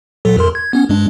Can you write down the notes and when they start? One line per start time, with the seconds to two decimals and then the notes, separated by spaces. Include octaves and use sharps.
0.25 A#2 F#3 A4
0.37 F2 A#4 C6
0.55 G#6
0.73 B3 C#4
0.89 G2 G#3 D4